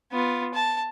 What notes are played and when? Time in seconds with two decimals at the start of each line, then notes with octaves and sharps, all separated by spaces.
0.12 B3 F4
0.54 A5